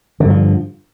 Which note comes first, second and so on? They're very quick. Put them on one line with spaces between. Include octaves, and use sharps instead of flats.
D3 G2 F3